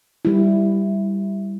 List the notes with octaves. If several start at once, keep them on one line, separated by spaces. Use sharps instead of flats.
G3 E4